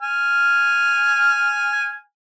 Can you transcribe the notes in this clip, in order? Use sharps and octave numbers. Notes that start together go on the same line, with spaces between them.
G#5 F6